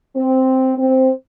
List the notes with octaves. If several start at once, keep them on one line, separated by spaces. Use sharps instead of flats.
C4
C4